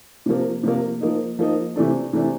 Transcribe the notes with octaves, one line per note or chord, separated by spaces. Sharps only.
C3 F3 A#3
C3 F3 A#3
F3 A#3 D#4
F3 A#3 D#4
C3 E3 A3 D4
C3 E3 A3 D4